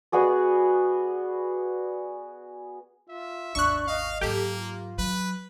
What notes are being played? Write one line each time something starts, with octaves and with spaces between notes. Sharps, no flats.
B3 F#4 G#4 D5
F4 E5
G#1 D#2 D4 C#6 F#6
D#5 F5
G#2 F#3 A#3 G4 A4
F4
F#3 B4